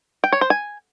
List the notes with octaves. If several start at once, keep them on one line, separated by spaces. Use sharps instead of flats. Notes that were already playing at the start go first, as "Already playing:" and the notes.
G5
C#5
C5
G#5